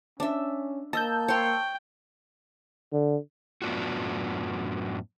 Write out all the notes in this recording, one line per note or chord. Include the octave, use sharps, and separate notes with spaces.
C#4 D4 E5
A#3 D#5 A5 E6 G6
C#5 G5 C6
D3
F#2 A2 B3 D4 F4 F#4